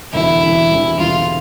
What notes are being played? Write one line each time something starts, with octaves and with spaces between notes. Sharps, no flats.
E1 D2 C3 E3 E4
E1 D2 C3 E3
E1 D2 C3 E3
E1 D2 C3 E3 F4